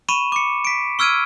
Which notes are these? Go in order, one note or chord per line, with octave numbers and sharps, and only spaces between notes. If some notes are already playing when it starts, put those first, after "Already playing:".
B5 C#6 D#7 E7
D6 C#7
B6 D7
C#6 E6 F6 G#6 D7 D#7